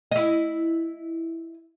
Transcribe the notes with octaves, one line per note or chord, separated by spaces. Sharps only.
E4 D#5